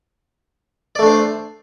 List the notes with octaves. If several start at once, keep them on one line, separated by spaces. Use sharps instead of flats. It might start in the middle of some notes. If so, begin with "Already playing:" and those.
A3 D4 C5 D5